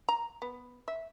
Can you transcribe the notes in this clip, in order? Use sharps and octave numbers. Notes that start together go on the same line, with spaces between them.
A#5
B3
E5